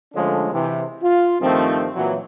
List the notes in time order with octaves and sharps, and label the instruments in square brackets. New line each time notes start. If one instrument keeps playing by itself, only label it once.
[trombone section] D3 F3 G#3 A3 C#4 D4
C3 E3
F4
G2 D#3 F3 A3 C4
A#2 E3 F#3